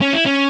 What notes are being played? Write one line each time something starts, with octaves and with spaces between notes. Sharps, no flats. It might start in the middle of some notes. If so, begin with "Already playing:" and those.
C#4
E4
C#4